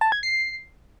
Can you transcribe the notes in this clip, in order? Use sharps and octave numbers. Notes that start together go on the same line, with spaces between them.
A5
G#6
C7